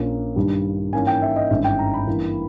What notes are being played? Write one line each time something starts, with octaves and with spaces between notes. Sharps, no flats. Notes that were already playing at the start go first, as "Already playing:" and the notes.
Already playing: A#1 A#2 A#3 C#4
G2 D#3 G3
G#2 E3 A#3 C#4 G#5
G5
E5
D#5
G#1 G2 E3 G#3 C#4 E5
G5
A#5
B5
G2 E3 A#3